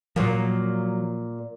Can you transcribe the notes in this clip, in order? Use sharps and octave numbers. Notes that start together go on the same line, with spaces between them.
A#2 F3 F#3 A#3